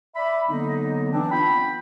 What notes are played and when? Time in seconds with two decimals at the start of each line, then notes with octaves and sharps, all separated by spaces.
0.16 D5 E5 B5
0.48 D3 F#3 A#3 B3 D#4
1.12 E3 C4 D4
1.31 B3 F4 G5 B5